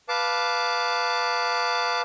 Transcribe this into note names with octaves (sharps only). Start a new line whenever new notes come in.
B4 F5 A5 D6